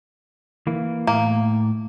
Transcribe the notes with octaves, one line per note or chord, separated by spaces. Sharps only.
E3 A#3
A2 A#3